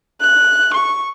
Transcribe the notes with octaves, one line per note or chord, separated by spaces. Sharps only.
F#6
C#6